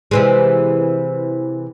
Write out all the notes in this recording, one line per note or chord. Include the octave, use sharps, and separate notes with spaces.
C3 E3 G#3